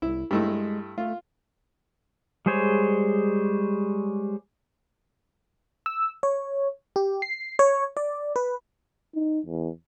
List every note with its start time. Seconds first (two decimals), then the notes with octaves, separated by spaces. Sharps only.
0.02 C2 E4
0.31 G2 G#3 A3 E4
0.98 A3 F4
2.46 G3 G#3 G#4 C5 C#5
5.86 E6
6.23 C#5
6.96 G4
7.22 C7
7.59 C#5
7.97 D5
8.36 B4
9.15 D#4
9.46 E2